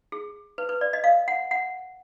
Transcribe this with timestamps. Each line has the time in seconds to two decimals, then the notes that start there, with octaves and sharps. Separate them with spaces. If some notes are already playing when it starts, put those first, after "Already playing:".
0.12 G#4
0.58 B4
0.69 B4
0.81 D5
0.93 D#5
1.04 F5
1.28 F#5
1.51 F#5